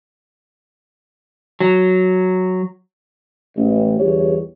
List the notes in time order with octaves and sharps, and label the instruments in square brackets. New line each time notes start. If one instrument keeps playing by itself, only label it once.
[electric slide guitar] F#3
[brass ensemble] A1
G1 E2 G4 C#5